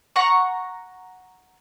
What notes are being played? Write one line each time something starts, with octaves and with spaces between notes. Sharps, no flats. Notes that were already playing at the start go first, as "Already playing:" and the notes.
F#5 A#5 C#6